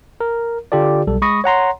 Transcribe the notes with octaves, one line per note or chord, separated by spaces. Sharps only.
A#4
D3 F4 G4 A4 D5
B1 G3 A4
G#3 B5 C#6 D#6 A#6
C#5 F#5 A#5 C6